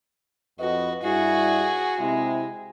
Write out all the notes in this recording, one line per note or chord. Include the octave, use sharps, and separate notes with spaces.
F2 F#4 B4 D#5
G2 E4 F#4 G#4
C3 G#3 E4